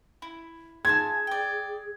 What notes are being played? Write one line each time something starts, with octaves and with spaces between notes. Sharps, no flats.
E4
F4 G#4 G#5 A5 G#6
D5 G5